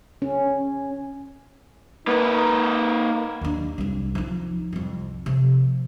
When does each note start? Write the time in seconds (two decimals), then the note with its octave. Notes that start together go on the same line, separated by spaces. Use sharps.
0.22 C#4
2.07 A#3 D#4 B4
3.41 D#2 D4
3.78 C2 F2
4.15 F3 D#4
4.73 C2 F2
5.26 C3 F3